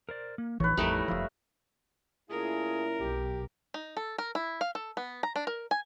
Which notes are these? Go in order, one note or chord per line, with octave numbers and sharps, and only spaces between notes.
A#4 C5 D5
A#3
A1 E3 F3 D#4 B4 C#5
A1 F2 G3 A3 D#4 E4 A#4
F1 F3 E5 F5 D#6
A#2 A3 C#4 E4 F4 G#4 A#4
B1 G4
D#4
A4
A#4
E4
F5
A4
B3
A#5
D4
A#4
G#5